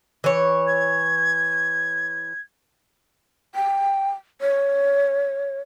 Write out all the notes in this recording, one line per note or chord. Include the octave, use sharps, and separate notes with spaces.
E3 C#5
G#6
G5
C#5